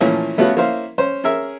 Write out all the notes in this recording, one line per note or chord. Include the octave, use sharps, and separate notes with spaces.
A#2 E3 F3 A3 C#4
G3 A3 B3 C#4 F4 F#4
A#3 C#4 E4 C5 F5
C#4 C5
C#4 G#4 A#4 E5